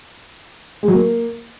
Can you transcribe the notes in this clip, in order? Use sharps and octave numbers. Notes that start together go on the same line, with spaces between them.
G#3
F#3
A#3